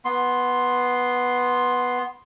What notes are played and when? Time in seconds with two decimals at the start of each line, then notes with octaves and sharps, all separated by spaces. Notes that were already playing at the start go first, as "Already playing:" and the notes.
0.05 B3 C6